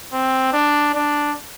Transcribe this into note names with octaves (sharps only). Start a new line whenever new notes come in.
C4
D4
D4